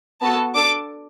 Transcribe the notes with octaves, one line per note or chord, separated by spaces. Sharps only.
B3 F#4 A4 A5
D4 A4 D6